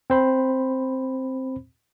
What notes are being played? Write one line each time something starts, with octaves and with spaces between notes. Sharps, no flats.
C4 C5 B5